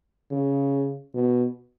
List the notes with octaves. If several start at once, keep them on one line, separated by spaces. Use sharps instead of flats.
C#3
B2